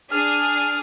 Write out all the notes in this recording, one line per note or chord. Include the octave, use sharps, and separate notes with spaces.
D4 G#4 F6